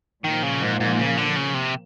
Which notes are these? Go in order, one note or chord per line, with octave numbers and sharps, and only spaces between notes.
A#2 D#3 F3 A#3
C#3
G#2
G#2
C#3
D3
C#3
C3